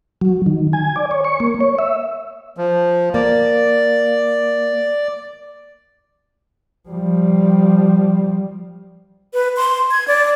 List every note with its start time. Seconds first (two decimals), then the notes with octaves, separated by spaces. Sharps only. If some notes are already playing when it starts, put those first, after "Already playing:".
0.21 F#3
0.46 D#3
0.73 G#5
0.96 D5
1.11 C#5
1.24 C#6
1.40 A#3
1.61 C#5
1.79 E5
2.57 F3
3.14 A#3 D5
6.89 F3 G3
9.34 B4
9.56 C6
9.91 G#6
10.08 D5